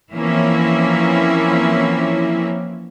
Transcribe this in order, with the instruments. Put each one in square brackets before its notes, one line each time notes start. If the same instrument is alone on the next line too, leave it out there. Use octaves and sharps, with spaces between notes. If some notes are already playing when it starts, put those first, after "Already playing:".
[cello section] E3 F3 A#3 C4 C#4 E4